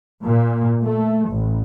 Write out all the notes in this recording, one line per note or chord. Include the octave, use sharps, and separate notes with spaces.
A#2
A3
A1